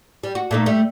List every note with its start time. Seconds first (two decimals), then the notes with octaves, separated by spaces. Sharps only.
0.23 G3
0.35 F#4
0.51 A#2 A3 D#4
0.66 G3 A3